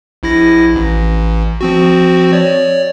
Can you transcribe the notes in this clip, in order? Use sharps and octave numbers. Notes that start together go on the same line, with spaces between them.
A#1 E4 A#6
A1
F3 C4 F#4
C#5 D5